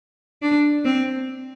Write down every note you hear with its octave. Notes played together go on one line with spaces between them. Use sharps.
D4
C4